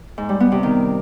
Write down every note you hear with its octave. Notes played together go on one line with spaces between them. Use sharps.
G#2
G3
B3
C3
D#3